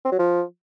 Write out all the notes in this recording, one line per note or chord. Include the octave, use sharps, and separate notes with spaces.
C4
F#3
F3